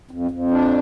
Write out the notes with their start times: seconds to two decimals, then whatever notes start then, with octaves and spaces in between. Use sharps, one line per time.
0.11 F2
0.31 F2
0.51 D4